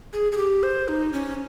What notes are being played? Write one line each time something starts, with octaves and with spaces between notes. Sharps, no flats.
G#4
G#4
G4
C5
D#4
C#4